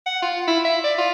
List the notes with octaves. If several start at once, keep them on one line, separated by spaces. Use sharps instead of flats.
F#5
F4
E4
E5
D5
F4